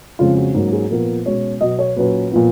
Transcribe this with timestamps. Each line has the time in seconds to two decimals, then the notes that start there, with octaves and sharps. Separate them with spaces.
0.19 F2 C#3 G#3 F4
0.37 F#4
0.54 G#2 F#3 A#3 C#4
0.73 G#4
0.90 A#2 F3 B3 A#4
1.26 B2 G#3 C#4 C#5
1.61 B2 F#3 B3 D#5
1.79 C#5
1.97 A#2 F#3 C#4 B4
2.32 A#2 F3 B3